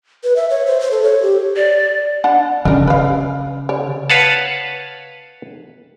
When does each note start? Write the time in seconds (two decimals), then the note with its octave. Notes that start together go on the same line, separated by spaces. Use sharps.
0.24 B4
0.36 E5
0.50 C#5
0.66 C5
0.80 C5
0.91 A4
1.03 C#5
1.22 G4
1.56 D5
2.24 D4 F#5 A5
2.65 C#3 D4 A#4
2.88 B4 F5
3.69 C#5 D5
4.10 B4 C#5 F5 F#5 A5